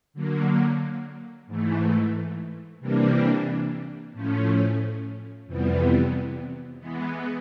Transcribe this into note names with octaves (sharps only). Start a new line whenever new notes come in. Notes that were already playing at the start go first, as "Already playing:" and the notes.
D3 F#3 A#3
G#2 E3 A3
C3 E3 G3 A#3 D4
A2 F3 A3 C#4
F2 C3 E3 G3 B3
E3 G#3 B3